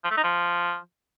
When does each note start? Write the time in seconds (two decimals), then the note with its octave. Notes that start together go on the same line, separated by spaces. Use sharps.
0.04 F3
0.11 A3
0.17 D#4
0.24 F3